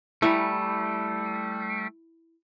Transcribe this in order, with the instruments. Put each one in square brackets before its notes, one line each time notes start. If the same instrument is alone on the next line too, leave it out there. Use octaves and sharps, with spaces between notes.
[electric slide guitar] G3 A3 [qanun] E4 G#5 A#5